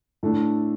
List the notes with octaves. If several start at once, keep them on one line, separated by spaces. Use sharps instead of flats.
A2 A3 D4